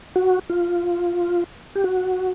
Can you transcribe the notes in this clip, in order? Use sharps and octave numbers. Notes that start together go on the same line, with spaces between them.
F#4
F4
G4
F#4